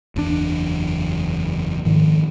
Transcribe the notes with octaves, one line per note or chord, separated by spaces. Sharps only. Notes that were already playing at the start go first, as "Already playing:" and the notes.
F#1 E2 G#2 D4
G#2 D#3 F3